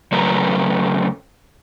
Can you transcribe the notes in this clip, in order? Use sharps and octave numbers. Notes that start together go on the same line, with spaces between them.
C#3 F#3 A3 A#4 B4